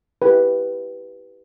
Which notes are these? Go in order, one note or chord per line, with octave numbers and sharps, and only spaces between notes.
E4 G4 B4